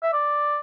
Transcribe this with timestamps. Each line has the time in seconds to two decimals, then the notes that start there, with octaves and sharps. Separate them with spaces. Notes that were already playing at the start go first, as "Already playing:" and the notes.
0.03 E5
0.13 D5